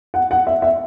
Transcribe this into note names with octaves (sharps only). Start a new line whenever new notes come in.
F#5
F#5
E5
E5